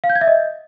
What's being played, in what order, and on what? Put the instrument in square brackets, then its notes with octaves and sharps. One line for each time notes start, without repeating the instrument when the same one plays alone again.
[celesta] F5
G6
G#6
E5
D#5